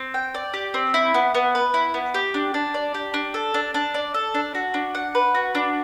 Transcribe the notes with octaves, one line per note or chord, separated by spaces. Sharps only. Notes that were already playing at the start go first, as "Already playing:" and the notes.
Already playing: C4
G5
D5
G4
C4
E4
B3
B3
B4
E4
B3
G4
D4
D4
D5
G4
D4
A4
D4
D4
D5
A4
D4
F#4
D4
F#5
B4
F#4
D4